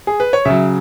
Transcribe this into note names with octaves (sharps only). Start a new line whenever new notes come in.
G#4
B4
C#5
C#3 F#3 E5